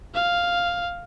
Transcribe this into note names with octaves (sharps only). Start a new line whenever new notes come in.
F5